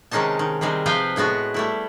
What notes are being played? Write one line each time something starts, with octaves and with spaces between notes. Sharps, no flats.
C3 D#3 G#3 C#4 D#4 A5
D#3
C3 D#3 G3 G#3
C3 F3 B4 F5 G5
A2 G#3 B3 F#4
G3 A3 E4